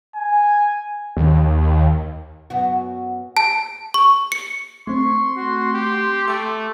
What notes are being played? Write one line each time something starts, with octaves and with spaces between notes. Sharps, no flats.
G#5
D#2
F#2 B3 F#4
A5
C#6
C#7
A3 C4 C6 C#6
F#4
G4
A3 D6